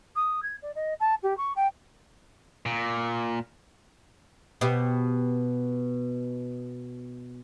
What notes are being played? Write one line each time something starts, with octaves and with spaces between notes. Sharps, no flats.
D#6
G#6
D5
D#5
A5
G4
C#6
G5
A#2
B2 B3 G4